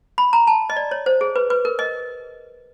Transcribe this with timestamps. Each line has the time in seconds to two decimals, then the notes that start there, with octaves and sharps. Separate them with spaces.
0.18 B5
0.33 A#5
0.47 A5
0.70 D#5
0.76 D5
0.91 C#5
1.06 C5
1.21 G#4
1.36 B4
1.50 B4
1.65 A#4
1.79 D#5